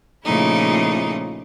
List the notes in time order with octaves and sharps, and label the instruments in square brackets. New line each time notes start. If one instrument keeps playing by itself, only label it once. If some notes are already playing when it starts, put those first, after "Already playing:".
[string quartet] A#2 C#3 F3 A3 D#4 E4